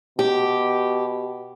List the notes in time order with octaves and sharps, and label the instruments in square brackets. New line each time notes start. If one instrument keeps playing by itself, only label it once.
[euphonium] B2 [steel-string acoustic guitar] G4